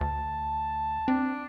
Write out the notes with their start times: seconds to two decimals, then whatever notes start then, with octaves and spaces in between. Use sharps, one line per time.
0.01 D2 A5
1.08 C4 D4